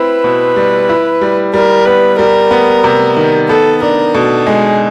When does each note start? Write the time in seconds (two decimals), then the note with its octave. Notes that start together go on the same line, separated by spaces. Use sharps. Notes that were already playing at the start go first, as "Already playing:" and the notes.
Already playing: C4 E4 B4
0.24 B2
0.56 G3
0.89 E4
1.21 G3
1.54 G3 A#4
1.86 B3 B4
2.19 G3 A#4
2.51 B3
2.84 C3
3.17 D#3
3.48 B3 A4
3.82 D4 A#4
4.14 B2 A4
4.47 G#3 G#4